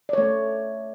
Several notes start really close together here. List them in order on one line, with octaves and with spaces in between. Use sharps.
D5 C#5 A3